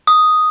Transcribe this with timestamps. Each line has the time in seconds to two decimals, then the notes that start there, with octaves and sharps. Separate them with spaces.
0.07 D#6